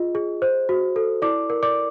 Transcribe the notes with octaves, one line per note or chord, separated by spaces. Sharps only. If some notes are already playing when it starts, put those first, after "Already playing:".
Already playing: F4 G#4 D#5
G#4
C5
F#4
A4
E4 D5 D6
A#4
D5 D6